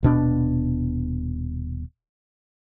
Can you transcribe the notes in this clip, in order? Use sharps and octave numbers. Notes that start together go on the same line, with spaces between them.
D#1 B2 D4